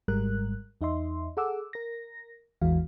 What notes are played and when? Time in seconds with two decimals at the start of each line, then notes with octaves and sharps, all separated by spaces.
0.08 G#1 G#2 G3 G#3 A#4 F#6
0.81 E2 D#4 D#5 E5 C6
1.37 G#4 A4 F#5 D6 E6
1.73 A#4 A#6
2.61 A1 E2 E3 G#3 F#4 F5